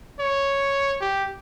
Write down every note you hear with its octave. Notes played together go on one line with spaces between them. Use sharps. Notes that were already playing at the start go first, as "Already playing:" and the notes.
C#5
G4